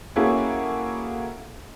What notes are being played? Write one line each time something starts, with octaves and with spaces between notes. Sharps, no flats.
A#3 C#4 E4 F#4 G#4 A4